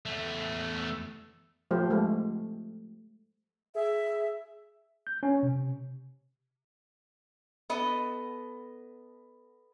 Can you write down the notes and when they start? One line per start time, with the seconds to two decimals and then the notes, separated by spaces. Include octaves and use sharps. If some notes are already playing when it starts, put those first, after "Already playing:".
0.06 E2 A3
1.71 F3 A3 G4 C5
1.90 G#3 A3
3.75 G#4 E5
5.07 G6
5.23 C#4
5.43 C3
7.70 B3 A4 D#5